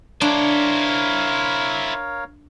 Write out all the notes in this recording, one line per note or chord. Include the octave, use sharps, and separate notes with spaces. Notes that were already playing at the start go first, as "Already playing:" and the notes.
D4 E4 A#4 C5 C#5 F5